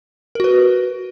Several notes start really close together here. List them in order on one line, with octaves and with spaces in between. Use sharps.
A#4 F#4 B4